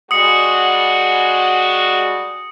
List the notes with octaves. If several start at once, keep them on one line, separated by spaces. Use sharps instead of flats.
G3 G#3 F#4 D#6 C#7